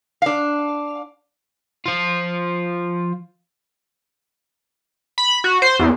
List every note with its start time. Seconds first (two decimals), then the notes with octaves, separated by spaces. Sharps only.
0.22 D4 F5
1.86 F3 F4
5.18 B5
5.44 F#4
5.62 C5
5.79 E2